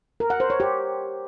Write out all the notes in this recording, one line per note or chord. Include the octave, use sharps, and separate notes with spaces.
A#4
F#5
C5
C#5
G4